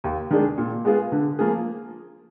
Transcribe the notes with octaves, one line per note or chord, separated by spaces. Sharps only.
D#2
D#3 G#3 D4 G#4
A#2
G#3 B3 F4 G#4
D3
F3 A#3 F4 G#4